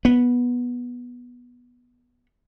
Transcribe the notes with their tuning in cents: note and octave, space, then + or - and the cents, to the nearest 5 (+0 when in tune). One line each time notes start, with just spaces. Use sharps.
B3 -10